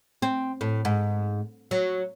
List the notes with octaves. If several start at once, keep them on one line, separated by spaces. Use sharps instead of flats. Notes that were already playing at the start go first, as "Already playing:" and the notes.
C4
A2
G#2
F#3